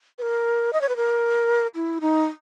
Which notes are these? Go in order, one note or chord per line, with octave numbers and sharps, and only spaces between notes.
B4
A#4
D#5
C#5
B4
A#4
E4
D#4